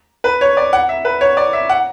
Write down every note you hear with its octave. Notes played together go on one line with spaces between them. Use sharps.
B4
C#5
D5
F#5
E5
B4
C#5
D5
E5
F#5